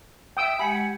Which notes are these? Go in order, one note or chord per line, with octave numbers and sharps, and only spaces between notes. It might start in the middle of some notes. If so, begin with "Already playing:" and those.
E5 G5 D#6 E6
G#3 G4 F#5 G#5 B5